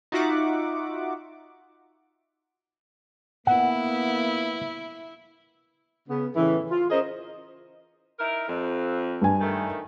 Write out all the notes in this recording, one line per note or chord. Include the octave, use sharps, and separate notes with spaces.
D#4 F4 F#4 E5 F#5 D6
A#3 B3 E4 F#5
C#3 B3
A2 C#3 E3
F4
C#4 G#4 A#4 C5 D#5
D#4 E4 A#4
F2
G2 G#5
D#3 A3